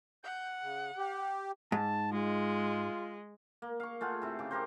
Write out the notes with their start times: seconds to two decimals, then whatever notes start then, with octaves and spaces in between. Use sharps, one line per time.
0.24 F#5 G6
0.62 C#3
0.98 G4
1.72 G#2 A5
2.12 G#3 F4
3.62 A#3
3.80 F5 C#6
4.01 A3 F4 G#4 F#5
4.22 C3 E4
4.39 C#3 D6
4.51 E4 G4 A#4 C5